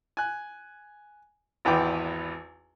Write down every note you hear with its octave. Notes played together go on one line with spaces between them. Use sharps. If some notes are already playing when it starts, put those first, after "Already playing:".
G#5 F#6
G#1 E2 B4 G5 D6